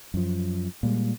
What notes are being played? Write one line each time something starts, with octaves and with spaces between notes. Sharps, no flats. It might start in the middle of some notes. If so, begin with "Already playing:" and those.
F#2 F3
A#2 G3 G#3